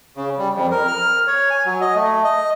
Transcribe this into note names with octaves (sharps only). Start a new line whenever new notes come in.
C#3
G3
F2
A#4
F6
C#5
G#5
F#3
D#5
A3
D#5